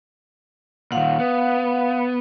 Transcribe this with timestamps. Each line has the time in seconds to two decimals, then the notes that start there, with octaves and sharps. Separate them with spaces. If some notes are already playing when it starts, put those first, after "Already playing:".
0.92 A#2 D#3 F5 F#5
1.19 B3